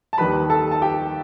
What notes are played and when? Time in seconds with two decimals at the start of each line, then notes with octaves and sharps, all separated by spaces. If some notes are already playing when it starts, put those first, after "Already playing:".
0.13 A5
0.18 D#2 D#3 G3 B4 B5
0.50 A4 A5
0.71 A5
0.82 G4 G5